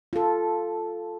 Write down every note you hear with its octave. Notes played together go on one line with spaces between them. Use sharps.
F4 A4